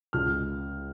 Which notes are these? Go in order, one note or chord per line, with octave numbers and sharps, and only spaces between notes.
C#2 F6